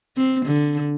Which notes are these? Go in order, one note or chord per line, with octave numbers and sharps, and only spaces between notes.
C4
D3